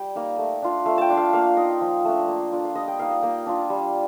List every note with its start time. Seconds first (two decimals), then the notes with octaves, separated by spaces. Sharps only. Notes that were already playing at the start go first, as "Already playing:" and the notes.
Already playing: G3 G5
0.15 A#3 D#4
0.38 A3
0.62 D4 F4
0.86 A3 F5
0.98 G5 A5
1.10 D4 F4
1.17 F5
1.33 A#3 F5
1.57 D#4 D#5
1.81 F3
2.05 A3 D4
2.28 A#3
2.52 D4 F4
2.65 F5
2.75 G3 D#5
2.88 G5
2.99 A#3 D#4 F5
3.11 D#5
3.22 A#3 G5
3.46 D4 F4
3.70 G3